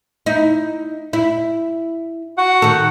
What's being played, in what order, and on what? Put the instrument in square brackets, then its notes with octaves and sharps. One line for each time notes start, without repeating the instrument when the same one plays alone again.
[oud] D#4 E4
E4
[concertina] F#4 F#5
[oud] D#3 A4